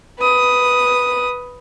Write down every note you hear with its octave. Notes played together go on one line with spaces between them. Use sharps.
B4 D#6